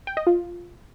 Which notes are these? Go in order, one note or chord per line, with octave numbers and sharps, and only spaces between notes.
G5
D#5
F4